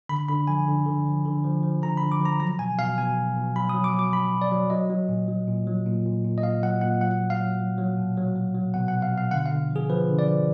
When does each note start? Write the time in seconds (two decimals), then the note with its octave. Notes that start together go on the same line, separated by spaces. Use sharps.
0.09 D3 B5
0.29 D3 B5
0.48 F3 G#5
0.68 D3
0.86 D3
1.06 F3
1.25 D3
1.44 F3
1.63 F3
1.82 D3 A#5
1.97 B5
2.02 D3
2.12 D6
2.20 F3
2.25 A#5
2.40 F#3 A#5
2.59 B2 G#5
2.78 B2 F5
2.98 B2 G#5
3.17 F#3
3.36 B2
3.56 F#3 B5
3.69 D#6
3.74 F#3
3.84 D6
3.93 F#3
3.99 D6
4.13 F#3 B5
4.32 B2
4.42 D5
4.51 F#3
4.70 F#3 D#5
4.90 F#3
5.09 A#2
5.28 F#3
5.47 A#2
5.67 F#3
5.86 A#2
6.05 A#2
6.25 A#2
6.38 D#5
6.43 A#2 F5
6.63 F#3 F#5
6.81 A#2 F#5
7.01 F#3 F#5
7.21 F#3
7.30 F5
7.40 F#3
7.59 F#3
7.78 F#3
7.97 B2
8.17 F#3
8.36 F#3
8.55 F#3
8.74 B2 F#5
8.88 F#5
8.94 B2
9.02 F5
9.12 B2
9.18 F5
9.31 D3 F#5
9.46 F5
9.51 D3
9.70 F3
9.76 G#4
9.90 F3 B4
10.09 D3
10.19 D5
10.27 F3